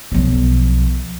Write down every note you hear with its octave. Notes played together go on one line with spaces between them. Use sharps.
B1 F3